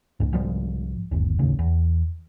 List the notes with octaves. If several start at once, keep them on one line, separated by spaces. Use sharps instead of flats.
C#2 G#2
C2 G#2 F3 G3
G1 D#2
A1 D#2 C#3
E2